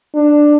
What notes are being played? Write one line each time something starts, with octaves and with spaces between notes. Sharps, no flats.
D4